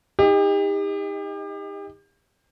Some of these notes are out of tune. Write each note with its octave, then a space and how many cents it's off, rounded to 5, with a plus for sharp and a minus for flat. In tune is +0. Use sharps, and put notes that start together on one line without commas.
D#4 +25 G4 +35 D#5 +0